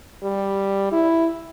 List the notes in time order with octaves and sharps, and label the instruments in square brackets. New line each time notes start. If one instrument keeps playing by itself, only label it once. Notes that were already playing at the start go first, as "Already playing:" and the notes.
[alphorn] G3
E4